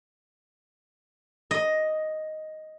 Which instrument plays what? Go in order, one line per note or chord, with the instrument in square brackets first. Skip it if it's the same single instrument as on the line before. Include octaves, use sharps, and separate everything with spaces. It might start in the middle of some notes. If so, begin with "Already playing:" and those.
[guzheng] D#5